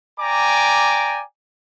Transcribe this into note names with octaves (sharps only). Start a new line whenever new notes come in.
D5 G5 G#5 A#5 D6